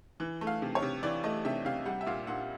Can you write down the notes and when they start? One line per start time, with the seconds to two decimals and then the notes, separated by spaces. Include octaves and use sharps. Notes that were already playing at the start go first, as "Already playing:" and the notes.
0.20 E3
0.41 A3
0.47 F5
0.62 C3
0.75 C#5
0.82 C3
1.03 E3 D5
1.24 A3 D#5
1.45 C3 E5
1.65 C3 F5
1.86 G3 F#5
2.01 E5
2.06 A#2 F5
2.27 A#2 F#5